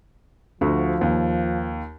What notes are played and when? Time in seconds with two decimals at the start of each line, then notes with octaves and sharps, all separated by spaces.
0.61 D2 F3 F#4
1.01 D#2